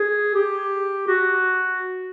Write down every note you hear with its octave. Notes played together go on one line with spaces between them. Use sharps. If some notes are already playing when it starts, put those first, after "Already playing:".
Already playing: G#4
G4
F#4